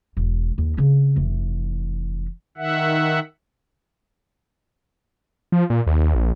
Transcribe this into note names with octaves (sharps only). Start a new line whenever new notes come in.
E1
D#2
C#3 C4
F1 E3
D#3 E5 F#5
F3
A#2
D#2
A#1